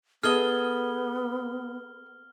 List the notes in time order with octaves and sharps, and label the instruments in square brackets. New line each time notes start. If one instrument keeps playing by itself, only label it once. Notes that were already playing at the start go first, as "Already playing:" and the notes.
[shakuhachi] B3 [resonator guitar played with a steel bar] G#4 A4 D#5 [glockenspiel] F6 G7